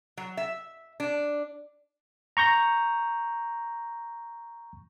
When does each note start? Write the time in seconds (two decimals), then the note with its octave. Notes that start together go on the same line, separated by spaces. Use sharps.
0.17 F#3
0.37 E5
1.00 D4
2.37 A#5 C#6 G6 A#6